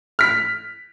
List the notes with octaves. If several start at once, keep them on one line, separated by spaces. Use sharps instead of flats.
F6 B6